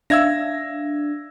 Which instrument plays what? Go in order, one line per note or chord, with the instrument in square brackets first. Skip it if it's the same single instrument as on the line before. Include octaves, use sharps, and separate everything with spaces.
[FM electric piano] D4 [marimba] E5 F5 [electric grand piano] E6 G#6 A#6